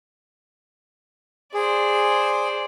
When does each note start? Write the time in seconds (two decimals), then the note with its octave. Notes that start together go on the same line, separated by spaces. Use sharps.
1.54 G#4 C5 D5